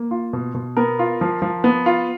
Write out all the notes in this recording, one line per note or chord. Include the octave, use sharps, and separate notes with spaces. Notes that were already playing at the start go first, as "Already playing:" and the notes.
Already playing: A#3
F4
B2
B2
B3 A#4
F4
F3
F3
B3
F4